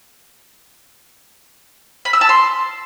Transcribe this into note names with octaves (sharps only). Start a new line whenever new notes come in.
B5
E6
A5
C6